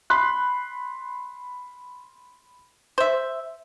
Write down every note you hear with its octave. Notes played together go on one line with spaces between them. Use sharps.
B5 C6 F#6
C5 E5